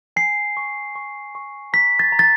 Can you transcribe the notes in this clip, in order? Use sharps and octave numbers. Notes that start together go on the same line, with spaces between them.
G#5 C7
C#6
C#6
C#6
A#5 B6
A6
A#5
A6